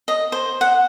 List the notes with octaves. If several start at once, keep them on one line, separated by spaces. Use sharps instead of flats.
D#5
C5
F#5